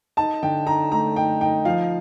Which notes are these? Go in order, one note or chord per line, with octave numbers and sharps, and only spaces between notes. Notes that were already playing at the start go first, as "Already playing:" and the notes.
D#4 A5
D3 G5
D#4 A#5
A3 A#5
D#4 G5
D#4 G5
F3 F5